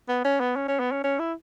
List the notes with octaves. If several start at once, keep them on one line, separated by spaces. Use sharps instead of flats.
B3
C#4
B3
C#4
C#4
B3
C#4
C#4
E4